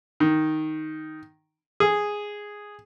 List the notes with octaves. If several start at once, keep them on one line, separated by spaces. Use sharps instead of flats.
D#3
G#4